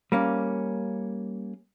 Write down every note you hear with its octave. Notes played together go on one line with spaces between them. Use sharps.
G3 A#3 C#4